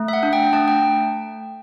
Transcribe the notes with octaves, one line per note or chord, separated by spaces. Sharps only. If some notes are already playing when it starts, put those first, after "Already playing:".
Already playing: A3
E5
F#5
D4
G5
A3 A5
G5